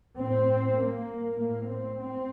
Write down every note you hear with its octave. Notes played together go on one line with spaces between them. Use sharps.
A2 C4
A#3
A2 A#3
C4
C4